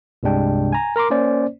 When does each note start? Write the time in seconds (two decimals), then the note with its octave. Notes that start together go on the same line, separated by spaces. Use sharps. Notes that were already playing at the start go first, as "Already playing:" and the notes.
0.23 C2 G2 C3 G#3 D4 G5
0.73 G#5 A#5
0.96 A#4 A#5 C6 D6
1.10 A#3 C#4 C5 D5